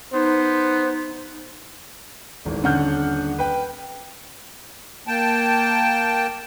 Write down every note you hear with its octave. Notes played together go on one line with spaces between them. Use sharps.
B3 D#4 C5
D#1 G#1 E2
D#1 D3 C#4 F#5 F6 G6
B4 G5
A#3 G5 A5